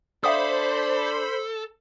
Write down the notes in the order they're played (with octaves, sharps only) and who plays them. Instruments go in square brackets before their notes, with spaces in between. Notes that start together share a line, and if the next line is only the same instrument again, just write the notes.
[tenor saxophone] D4 [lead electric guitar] A4 [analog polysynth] C5 B5 [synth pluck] E5 F5 D#6